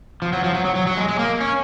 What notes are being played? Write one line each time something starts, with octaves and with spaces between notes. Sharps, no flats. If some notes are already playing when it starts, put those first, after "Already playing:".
F3
F#3
F3
F#3
F#3
F#3
F#3
G#3
G#3
A#3
C#4